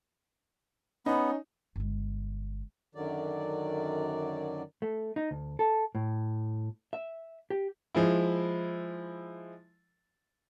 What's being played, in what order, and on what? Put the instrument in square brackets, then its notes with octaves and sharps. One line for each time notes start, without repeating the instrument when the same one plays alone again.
[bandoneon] B3 [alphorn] C#4 [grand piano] D#4 [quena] B5
[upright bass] G1 G#3
[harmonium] F#2 D3 D#3 F#3 D5
[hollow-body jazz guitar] A3
D#4
D2
A4
A2
E5
G4
[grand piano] F3 G#3 E4